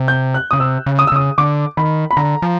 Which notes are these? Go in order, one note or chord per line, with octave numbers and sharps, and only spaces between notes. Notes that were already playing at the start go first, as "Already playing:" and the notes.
Already playing: C3
G6
F#6
C#3 D#6
C3 E6
C#3
D#6
E6
C#3 D#6
D3 D6
D#3 B5
B5
D3 A#5
F3